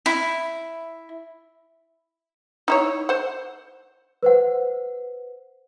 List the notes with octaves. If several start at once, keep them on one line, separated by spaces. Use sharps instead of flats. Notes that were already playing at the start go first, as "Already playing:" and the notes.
E4
D#4 E4 C#5
C5 F#5
B4 C5 F#5